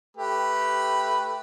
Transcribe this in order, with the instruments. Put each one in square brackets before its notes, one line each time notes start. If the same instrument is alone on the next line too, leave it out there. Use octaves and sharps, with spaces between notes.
[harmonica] A3 G4 B4